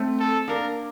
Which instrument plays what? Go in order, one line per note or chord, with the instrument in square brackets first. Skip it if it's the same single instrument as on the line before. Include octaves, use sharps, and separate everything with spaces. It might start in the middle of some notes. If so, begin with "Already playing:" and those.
Already playing: [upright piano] A3 C4
[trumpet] A4
[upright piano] A#3 D4 [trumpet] A#4